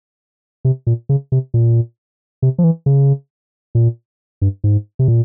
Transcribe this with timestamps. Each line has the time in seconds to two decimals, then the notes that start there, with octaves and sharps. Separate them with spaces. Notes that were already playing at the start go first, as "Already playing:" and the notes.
0.65 C3
0.87 A#2
1.09 C#3
1.32 C3
1.54 A#2
2.42 C3
2.58 F3
2.64 E3
2.86 C#3
3.75 A#2
4.42 G2
4.64 G#2
4.99 C3
5.08 A#2